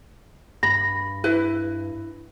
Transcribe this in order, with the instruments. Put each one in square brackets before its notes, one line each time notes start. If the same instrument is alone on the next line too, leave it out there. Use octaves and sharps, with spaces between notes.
[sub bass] G2 [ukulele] B5 [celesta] A#6
[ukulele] E4 B4